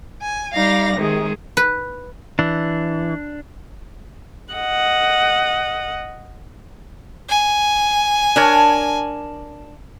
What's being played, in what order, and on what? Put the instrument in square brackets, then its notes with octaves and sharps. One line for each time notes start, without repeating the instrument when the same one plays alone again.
[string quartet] G#5
G3 D#4 D5 F5 A#6
C3 D#3 G#3 G#4
[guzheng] B4
[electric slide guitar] E3 [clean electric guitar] D4
[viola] D#5 F#5
[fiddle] G#5
[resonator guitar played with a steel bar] D4 A#4 C#5